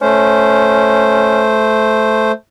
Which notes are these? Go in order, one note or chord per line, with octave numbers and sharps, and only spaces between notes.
A3 C#4 C5